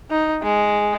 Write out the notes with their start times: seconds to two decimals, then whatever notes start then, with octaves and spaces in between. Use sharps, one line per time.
0.11 D#4
0.43 G#3